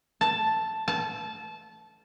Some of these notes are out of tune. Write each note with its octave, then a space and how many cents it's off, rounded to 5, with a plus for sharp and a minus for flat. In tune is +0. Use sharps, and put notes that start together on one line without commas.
A5 +0
A5 -20